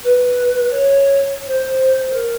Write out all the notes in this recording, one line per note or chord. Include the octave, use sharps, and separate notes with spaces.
B4
C#5
C5
A#4